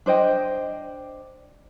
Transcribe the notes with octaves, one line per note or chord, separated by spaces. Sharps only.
D4 C5 D#5 G5